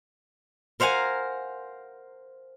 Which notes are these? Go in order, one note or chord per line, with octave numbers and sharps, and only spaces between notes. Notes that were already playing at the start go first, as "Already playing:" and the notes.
A#4 C5 F5 F#5 G#5